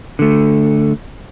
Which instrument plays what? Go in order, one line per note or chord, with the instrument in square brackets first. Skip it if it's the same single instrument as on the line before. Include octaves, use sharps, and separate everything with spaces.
[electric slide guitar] D3 A3